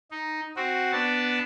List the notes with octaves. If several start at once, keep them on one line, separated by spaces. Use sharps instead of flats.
D#4
C4 F#4
B3 D4 A5